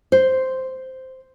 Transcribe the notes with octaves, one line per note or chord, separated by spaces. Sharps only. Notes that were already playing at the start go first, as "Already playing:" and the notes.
C5